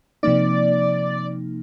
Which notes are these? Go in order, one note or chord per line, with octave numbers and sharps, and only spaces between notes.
C3 F3 A#3 D#4 D5